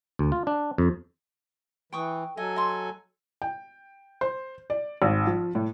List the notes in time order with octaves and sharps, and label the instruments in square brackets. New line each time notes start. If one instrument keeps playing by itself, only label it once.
[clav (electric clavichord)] D2
F4
D4
F2
[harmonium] E3 [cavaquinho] G5 C#6 D#6
[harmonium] F#3 A4 G#5 [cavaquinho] D#5
[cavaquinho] D#5 C6
[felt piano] G5
C5
D5
G#1
F3
A2